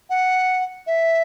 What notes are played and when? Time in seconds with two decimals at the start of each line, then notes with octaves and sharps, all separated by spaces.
0.10 F#5
0.87 E5